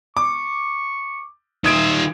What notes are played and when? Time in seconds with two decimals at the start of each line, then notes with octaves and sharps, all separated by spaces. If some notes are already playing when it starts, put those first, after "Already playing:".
0.17 C#6 D6
1.64 D#3 F4 E5 D#6 G#6 D7